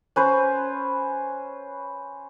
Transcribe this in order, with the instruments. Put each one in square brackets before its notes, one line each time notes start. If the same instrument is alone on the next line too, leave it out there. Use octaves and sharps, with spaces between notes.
[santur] C#4 B4 C5